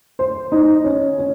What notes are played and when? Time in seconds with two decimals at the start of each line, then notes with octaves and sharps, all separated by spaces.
0.19 C5
0.52 D#4
0.84 C#4
1.18 C#4